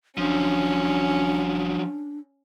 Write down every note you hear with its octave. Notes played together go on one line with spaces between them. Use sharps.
F#1 F3 F#3 C#4 D4